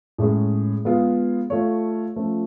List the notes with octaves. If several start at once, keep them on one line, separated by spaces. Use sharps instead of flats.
A2 G#3 C#4 G#4
G#3 B3 F4 G#4
A3 F4 A4 C#5
F3 A3 C#4 F4